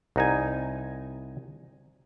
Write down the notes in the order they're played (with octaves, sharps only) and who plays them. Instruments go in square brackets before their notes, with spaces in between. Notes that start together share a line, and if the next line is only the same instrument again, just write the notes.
[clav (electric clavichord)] C2 D#4 G#5